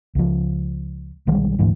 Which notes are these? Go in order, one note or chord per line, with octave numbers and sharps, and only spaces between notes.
C#2 F3
B1 D#3 G3 G#3
D2 G#2 E3